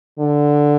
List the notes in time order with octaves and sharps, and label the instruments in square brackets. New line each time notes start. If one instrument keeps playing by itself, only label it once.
[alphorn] D3